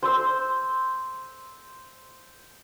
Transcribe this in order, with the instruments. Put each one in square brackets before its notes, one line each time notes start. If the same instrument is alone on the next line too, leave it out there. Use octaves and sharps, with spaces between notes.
[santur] C5 C6 E6